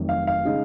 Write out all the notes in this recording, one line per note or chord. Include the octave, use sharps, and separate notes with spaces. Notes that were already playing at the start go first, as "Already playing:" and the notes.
Already playing: F1 F2 D#3 F#3
F5
F5
C#3 G#3 D#4